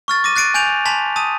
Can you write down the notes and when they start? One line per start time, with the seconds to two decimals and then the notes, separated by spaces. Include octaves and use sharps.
0.08 C#6 F6 A6
0.24 D6 A#6 D#7
0.36 F#6 A6 C7 D7 D#7
0.54 G#5 G6 D7 F7 F#7
0.85 G#5 A5 C6 B6 F7
1.16 A5 D#6 D#7